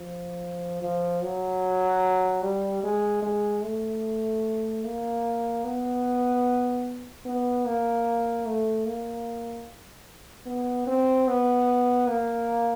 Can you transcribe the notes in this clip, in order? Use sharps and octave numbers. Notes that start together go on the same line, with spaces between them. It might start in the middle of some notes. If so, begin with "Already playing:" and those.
Already playing: F3
F3
F#3
G3
G#3
G#3
A3
A#3
B3
B3
A#3
A3
A#3
B3
C4
B3
A#3